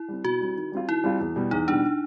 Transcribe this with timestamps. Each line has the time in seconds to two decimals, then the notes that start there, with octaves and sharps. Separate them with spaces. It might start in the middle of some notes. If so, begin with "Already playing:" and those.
Already playing: E4
0.08 G3 C4
0.24 B2 F#4
0.41 G3 C4
0.56 D#3
0.72 G3 C4 F4
0.88 D#3 E4
1.04 G3 C4 F4
1.20 E2
1.36 B2 G3
1.51 E2 D#4
1.68 B2 G3 D4